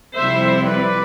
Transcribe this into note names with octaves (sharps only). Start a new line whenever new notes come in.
F2 C3 G3 C4 E4 C5 E5
B4 D5